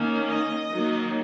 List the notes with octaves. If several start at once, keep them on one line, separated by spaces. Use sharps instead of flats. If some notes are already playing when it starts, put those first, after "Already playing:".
Already playing: D#3 A#3 C#4
D#5
D#3 F#3 A#3